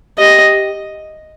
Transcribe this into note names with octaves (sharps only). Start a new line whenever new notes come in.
G4 D#5